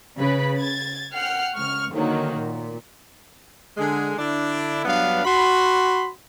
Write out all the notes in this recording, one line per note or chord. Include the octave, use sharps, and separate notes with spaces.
C#3 B4 B5
G#6 A6
F#5 G5 F6 C7
C#2 C#6 F6
D3 D#3 F#3 A#3
A#2
D3 G#3 G#4
D3 D4 E4
G2 F#3 B3 D4 B4 F5
F#4 B5 C6